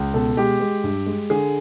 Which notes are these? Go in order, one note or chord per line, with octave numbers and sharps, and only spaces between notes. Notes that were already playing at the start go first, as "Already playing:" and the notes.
Already playing: C#2
B2 A4
G#3 G4
G#3
G2
G#3
D3 G#4